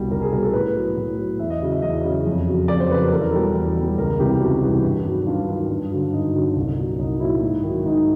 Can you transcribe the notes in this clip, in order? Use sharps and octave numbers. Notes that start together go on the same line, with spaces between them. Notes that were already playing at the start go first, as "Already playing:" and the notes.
Already playing: C2 B2 G3
C2 A#4
G#4
B2 G3 A#4
A4
A2 B4
F#3
A2
F#3
E2 E5
D#5
C#3 F#3
E5
E2 D#5
C#3 F#3
F2
C#3 F#3
F2 D5
C5
C#3 F#3 B4
A#4
E2 A4
A#4
B2 G3 A4
E2
B2 G3
C#2 A#4
C3 E3 G3 G4
C#2 F#4
C3 E3 G3
G2
D#3 F#3
G2 F4
D#3 F#3
G2
D3 F#3
G2 D#4
D3 F#3
C2
A#2 F#3
C2 D#4
A#2 F#3 E4
G#2
D#3 F#3
G#2 D#4